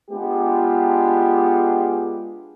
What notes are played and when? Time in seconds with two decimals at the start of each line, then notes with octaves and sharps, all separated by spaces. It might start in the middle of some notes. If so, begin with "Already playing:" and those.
0.11 G#3 B3 D4 F4 G4 G#4